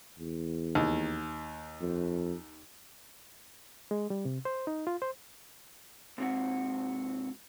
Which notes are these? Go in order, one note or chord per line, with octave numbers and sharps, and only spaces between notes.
E2
D#2
F2
G#3
G3
C3
C5
D#4
F4
C5
G#2 C3 C4 F#4